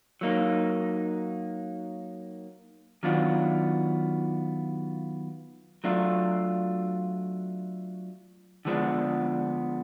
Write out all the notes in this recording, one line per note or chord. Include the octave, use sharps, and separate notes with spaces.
F#3 A#3 D#4
D#3 F#3 B3 D4 F4
F#3 A3 D4 F4
D3 F3 G#3 B3 D4